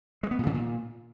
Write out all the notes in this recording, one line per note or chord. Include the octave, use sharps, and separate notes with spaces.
G#3
B3
A#2
C#3
A#2